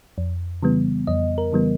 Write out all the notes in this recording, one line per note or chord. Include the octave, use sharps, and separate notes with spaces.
F2
C#3 E3 G3 B3
F2 D#5
A#4
C#3 E3 G3 B3